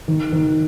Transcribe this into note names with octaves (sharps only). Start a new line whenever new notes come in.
D#3
D#3